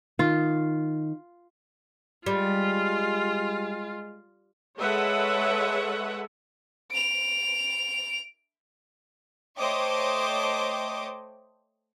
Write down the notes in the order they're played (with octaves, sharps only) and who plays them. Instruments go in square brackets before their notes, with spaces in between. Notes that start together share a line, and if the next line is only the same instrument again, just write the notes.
[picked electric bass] D#3 [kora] F4
[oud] G3 [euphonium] G#3 [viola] F4
[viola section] G#3 A4 B4 C#5 E5 F#5
[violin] D7 F7
[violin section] A3 C5 C#5 D#5 G5 D6